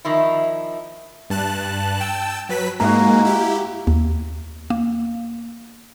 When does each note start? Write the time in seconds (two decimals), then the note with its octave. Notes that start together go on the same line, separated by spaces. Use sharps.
0.05 D#3 F3 E4
1.30 G2 A5 F#6
2.00 G5 A5 E6
2.49 F#3 B4 B6
2.80 G#2 G#3 A#3 F#4 F5 A#5
3.25 E4 G4
3.87 D#2
4.70 A#3